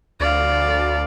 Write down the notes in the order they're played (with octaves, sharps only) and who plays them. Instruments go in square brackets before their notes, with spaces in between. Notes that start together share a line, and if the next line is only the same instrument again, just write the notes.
[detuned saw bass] D2 [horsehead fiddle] D5 F5